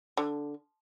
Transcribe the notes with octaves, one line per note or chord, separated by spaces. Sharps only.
D3